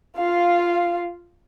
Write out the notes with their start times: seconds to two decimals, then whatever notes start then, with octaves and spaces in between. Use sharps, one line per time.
0.17 F4 F5